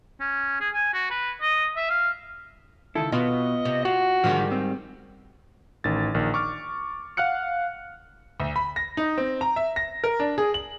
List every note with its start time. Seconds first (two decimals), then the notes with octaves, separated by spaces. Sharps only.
0.20 C#4
0.60 G#4
0.74 G#5
0.94 F#4
1.10 B4
1.41 D#5
1.76 E5
1.90 F5
2.95 C#2 D#3 E4 A4
3.12 B2 B3 F4 D#5
3.65 C3
3.85 F4 F#4
4.24 G#2 D3 D#3 F3 G3
4.51 C4
5.84 A1 D#3 A6
6.14 A#1 D#3
6.34 C#6 D6 F6
7.17 F5 F#5 F6 F#6 C#7
8.40 D2
8.56 B5
8.76 A#6
8.97 D#4
9.18 C4
9.41 A#5
9.56 E5
9.76 A#6
10.04 A#4
10.20 D4
10.38 G#4
10.54 F#7